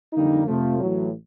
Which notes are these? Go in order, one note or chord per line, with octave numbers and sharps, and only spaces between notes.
F2 D3 G3 A#3 D#4
F2 C3 F3 A3
A1 A2 F#3